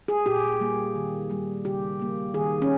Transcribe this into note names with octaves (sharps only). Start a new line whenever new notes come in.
G#4
A#2 G4
G3 A#3
D#3
G3 A#3
C#3 G4
G3 A#3
D#3 G#4
C#4